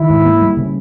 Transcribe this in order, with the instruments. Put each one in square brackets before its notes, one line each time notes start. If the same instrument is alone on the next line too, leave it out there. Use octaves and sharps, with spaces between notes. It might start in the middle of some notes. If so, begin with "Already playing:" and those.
Already playing: [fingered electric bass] D#3 [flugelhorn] E4
[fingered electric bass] G#2
A#3
G3
C#3